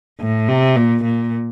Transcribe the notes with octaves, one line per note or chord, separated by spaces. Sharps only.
A2
C3
A#2
A#2